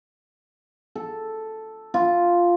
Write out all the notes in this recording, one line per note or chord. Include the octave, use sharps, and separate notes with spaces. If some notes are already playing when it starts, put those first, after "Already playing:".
A4
F4